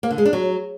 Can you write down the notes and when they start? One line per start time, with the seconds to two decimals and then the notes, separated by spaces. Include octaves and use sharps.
0.03 A#3
0.11 D3
0.18 G#3
0.25 D4
0.33 F#3